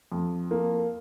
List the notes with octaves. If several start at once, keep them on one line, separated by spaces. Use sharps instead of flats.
F2
A#3